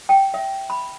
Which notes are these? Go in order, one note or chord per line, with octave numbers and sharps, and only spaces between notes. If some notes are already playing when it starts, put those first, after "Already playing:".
G5
E5
B5